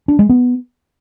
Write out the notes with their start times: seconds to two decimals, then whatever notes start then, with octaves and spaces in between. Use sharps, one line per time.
0.08 D4
0.19 G#3
0.29 B3